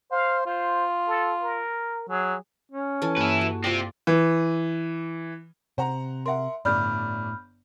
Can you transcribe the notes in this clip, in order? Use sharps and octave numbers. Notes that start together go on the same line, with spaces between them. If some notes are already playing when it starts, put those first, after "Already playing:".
C5 F5
F4 C5
A4
A#4
F#3 G#4
C#4
E3 A4 G#5
G2 A#3 E4 B4
F#4
C4 F4 G4 D5
E3
C3 C5 F#5 A#5
A#4 E5 F#5 C6
G1 A2 D5 B5 F6 G6